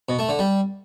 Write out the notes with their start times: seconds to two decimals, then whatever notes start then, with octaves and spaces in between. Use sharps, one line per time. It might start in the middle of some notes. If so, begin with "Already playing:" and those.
0.09 B2
0.19 A3
0.29 D3
0.39 G3